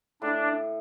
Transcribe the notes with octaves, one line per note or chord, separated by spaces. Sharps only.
A2 D4